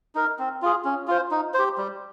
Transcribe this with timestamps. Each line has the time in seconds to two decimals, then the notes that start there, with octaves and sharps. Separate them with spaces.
0.15 D#4 A#4
0.39 C4
0.62 F4 G#4
0.84 C#4
1.07 F4 C5
1.31 D#4
1.54 G4 C5
1.78 G3